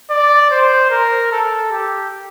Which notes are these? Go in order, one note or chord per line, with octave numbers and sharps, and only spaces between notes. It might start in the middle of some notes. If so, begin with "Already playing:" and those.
D5
C5
A#4
A4
G4